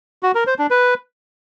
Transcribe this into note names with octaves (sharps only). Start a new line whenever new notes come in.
F#4
A#4
C5
D4
B4